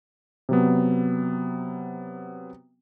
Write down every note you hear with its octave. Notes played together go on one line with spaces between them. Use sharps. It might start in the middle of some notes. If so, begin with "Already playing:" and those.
C3 F#3 B3